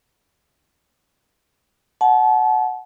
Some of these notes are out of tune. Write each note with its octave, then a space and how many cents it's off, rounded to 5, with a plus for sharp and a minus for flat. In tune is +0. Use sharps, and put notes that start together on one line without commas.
F#5 +0 A5 -30